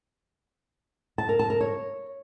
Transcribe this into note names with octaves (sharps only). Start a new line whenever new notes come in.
A5
A#4
A5
A#4
C#5